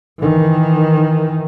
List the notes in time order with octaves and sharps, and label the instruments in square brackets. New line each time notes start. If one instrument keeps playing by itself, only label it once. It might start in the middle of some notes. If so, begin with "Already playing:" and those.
[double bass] D#3 E3